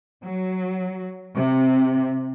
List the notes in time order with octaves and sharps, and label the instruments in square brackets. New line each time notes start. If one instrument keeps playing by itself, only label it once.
[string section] F#3
C3